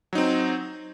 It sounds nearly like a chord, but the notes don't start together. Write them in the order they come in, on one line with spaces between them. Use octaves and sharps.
F#3 D#4 C4